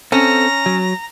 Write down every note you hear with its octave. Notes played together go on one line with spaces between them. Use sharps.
C4 C#4 A4 A#5
F#3